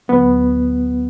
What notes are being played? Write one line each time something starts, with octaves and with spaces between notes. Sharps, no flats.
D2 D3 F#3 B3